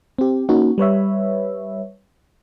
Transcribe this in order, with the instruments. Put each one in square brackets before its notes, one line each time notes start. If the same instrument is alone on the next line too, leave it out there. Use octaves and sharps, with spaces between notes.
[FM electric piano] C4 G4
A#3 C#4 D#4 F#4
G3 B4 C#5 E5